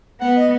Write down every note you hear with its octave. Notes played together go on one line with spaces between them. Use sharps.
B3 F#5
D#5